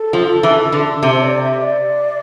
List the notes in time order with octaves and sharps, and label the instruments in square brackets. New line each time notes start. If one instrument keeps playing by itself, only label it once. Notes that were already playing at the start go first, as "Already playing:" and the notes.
Already playing: [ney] A4
[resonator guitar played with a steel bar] F3
E3
D3
[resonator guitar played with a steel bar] C3 [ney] E5
[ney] C5
D5
E5
D5